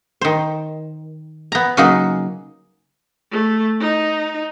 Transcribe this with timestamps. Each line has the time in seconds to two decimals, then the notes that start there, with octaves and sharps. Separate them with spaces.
0.21 D#3 C5
1.52 B3 A#5
1.77 C#3 F#3 A#3 D#4 F#4 G#4
3.31 A3
3.81 D#4